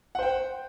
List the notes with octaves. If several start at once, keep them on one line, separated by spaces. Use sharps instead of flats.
C5 F#5 G5